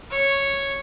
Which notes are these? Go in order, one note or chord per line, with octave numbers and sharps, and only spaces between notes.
C#5